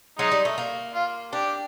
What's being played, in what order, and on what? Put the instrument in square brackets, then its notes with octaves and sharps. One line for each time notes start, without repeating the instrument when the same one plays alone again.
[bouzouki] F#3 [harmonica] G#3 D#4
[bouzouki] G3
A3
A#3
[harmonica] F4
[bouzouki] D4 [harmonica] G4